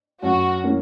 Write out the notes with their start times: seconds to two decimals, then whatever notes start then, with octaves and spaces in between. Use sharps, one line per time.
0.23 F#2 F#4
0.64 E3 A#3 C#4